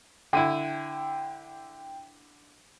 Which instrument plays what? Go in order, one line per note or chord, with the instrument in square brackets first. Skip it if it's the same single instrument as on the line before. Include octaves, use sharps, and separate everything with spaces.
[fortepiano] D3 E4 [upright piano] G5 D#7